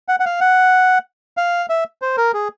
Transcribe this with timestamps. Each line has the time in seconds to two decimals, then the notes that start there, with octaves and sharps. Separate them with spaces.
0.08 F#5
0.20 F#5
0.25 F5
0.41 F#5
1.37 F5
1.69 E5
2.02 C5
2.17 A#4
2.34 G#4